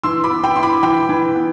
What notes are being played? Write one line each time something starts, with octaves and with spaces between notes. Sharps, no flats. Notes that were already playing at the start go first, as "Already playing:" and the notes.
E3 C6 E6
B5 D6
B3
G5 B5
E4 C6
B5 D6
E3 G5 B5
E3
B3